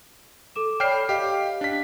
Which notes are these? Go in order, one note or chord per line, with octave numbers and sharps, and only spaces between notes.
A4 D6 E7
C#5 D5 G5 B5 F6 C7
G4 D#5 F5 G5
D4 B6